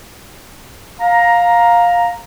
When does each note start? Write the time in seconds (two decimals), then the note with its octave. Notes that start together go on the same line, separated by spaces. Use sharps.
1.00 F5 A#5